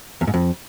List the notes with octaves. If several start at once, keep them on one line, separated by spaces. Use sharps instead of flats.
E2
G#2
F2